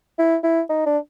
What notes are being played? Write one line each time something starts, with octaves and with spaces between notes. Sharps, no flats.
E4
E4
D#4
D4